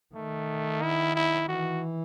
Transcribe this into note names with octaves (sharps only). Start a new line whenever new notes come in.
D#3 A3
E4
E4
E3 F#4